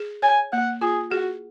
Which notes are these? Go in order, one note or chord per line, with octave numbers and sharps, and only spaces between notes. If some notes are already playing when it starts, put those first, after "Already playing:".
Already playing: G#4
C#5 G#5
A#3 F#5
F4 G#4
F#4 G#4